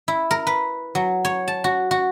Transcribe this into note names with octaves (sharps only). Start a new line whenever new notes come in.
E4
A#4
B4
F#3
C#5
A5
F#4
F#4